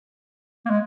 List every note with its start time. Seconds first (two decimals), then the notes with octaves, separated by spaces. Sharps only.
0.66 A#3
0.70 G#3